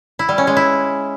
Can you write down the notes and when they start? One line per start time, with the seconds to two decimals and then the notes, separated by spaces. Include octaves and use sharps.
0.19 E4
0.29 G3
0.38 C#4
0.47 G#3
0.57 E4